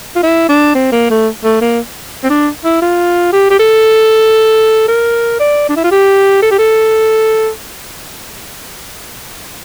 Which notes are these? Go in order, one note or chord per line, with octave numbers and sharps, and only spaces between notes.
F4
E4
D4
C4
A#3
A3
A3
A#3
C4
D4
E4
F4
G4
G4
A4
A#4
D5
D4
E4
F4
G4
A4
G4
A4